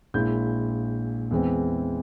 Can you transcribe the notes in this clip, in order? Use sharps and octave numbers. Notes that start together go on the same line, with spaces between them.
A#1 A#2 G#3 E4 G6
E2 E3 G#3 C4